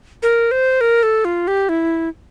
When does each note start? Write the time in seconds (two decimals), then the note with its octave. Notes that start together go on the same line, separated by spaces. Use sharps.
0.23 A#4
0.51 C5
0.81 A#4
1.03 A4
1.25 F4
1.48 G4
1.69 E4